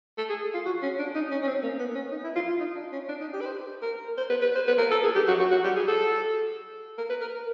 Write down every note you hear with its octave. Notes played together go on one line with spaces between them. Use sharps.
A4
G#4
F4
F#4
C#4
D4
D#4
C#4
C#4
C4
A#3
B3
C#4
D#4
E4
F4
F4
D#4
D4
C#4
D4
D#4
G4
B4
C5
A#4
C5
B4
B4
C5
B4
A#4
A4
G#4
G4
F#4
F#4
F#4
G4
G#4
A4
A#4
B4
A#4